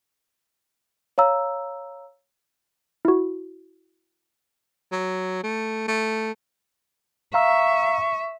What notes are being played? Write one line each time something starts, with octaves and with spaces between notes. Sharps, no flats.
C#5 F5 A#5 E6
E4 F#4
F#3
A3
A3
E5 F5 A#5 C#6 E6